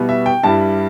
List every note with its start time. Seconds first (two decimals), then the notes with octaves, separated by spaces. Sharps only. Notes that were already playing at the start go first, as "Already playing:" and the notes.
Already playing: B2 G3 B3 E4
0.09 E5
0.26 G5
0.43 G2 G3 E4 A5